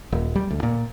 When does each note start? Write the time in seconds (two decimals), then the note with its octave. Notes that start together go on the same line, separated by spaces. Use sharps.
0.12 D#1
0.36 G3
0.50 D2
0.63 A#2